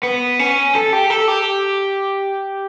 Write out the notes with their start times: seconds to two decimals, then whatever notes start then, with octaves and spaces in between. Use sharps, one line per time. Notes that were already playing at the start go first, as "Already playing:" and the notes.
0.03 B3
0.39 C#4
0.75 A4
0.93 G4
1.10 A4
1.28 G4